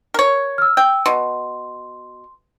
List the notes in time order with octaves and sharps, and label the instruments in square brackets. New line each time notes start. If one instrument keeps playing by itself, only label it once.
[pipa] A#4 C#5
[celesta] E6 F6
[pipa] G5 [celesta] E6
[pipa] B2 [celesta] C6